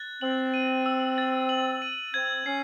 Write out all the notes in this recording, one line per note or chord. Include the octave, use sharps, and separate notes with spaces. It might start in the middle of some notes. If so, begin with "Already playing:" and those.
Already playing: F#6 A6
C4 F#7
D#7
E6
A6
F#7
D#7
C4 G#6
C#4 C7